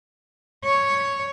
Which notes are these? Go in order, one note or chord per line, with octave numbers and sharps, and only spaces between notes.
C#5